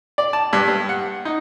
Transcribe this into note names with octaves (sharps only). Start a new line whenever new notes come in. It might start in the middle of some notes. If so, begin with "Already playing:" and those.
D5
A5
G2
G2
F#5
D#4